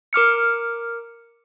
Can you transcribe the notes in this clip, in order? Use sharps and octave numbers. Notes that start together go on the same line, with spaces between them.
A#4 D6 F6 C#7